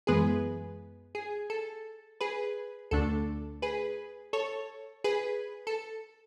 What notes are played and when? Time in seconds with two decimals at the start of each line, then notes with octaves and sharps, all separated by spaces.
0.07 F#2 E3 G#3 B3 G#4 B4
1.15 G#4
1.50 A4
2.21 G#4 B4
2.91 D2 D3 A3 D4 A4
3.62 G#4 B4
4.33 A4 C#5
5.04 G#4 B4
5.67 A4